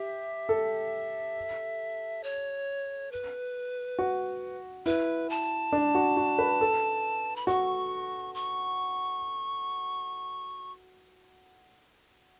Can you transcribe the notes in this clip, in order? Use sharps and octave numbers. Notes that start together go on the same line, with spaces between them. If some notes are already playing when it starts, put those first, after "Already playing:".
Already playing: G4 E5
A4
C#5
B4
F#4
E4 B4
A5
D4
F#4
F#4
B4
A4
B5
F#4 C#6
C#6